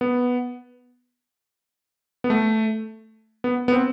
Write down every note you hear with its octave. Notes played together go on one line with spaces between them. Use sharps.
B3
B3
A3
B3
B3
C4